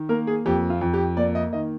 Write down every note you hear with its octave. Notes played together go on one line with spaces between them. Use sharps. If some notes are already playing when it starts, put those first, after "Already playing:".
Already playing: D#3
A#3 A#4
G#4
F2 G4
F4
F2
G4
A#3 D5
D#5
D#3 D#5